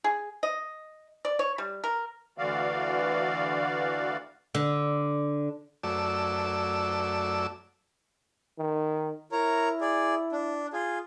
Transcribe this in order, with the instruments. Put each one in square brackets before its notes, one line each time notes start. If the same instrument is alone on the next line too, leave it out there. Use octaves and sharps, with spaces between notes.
[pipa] G#4
D#5
D5
C#5
G3
A#4
[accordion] D2 D3 E3 F#4 D5 F5
[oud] D3
[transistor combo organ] F#2 A3 D5 E6
[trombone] D#3
[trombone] E4 [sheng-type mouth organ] A#4 C#5 A#5
[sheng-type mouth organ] G#4 D5
D4
F4 G#4